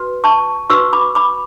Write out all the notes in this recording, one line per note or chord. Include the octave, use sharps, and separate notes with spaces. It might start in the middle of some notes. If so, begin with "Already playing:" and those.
Already playing: F#4 B4
A5 C#6
F#4 B4 C#6 E6
B5 D6
B5 D6